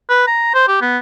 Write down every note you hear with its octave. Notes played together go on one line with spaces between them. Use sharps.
B4
A#5
C5
G4
B3